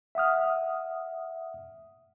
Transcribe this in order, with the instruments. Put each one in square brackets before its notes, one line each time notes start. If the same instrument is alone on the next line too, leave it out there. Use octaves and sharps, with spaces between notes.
[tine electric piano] E5 F#5 D#6 F6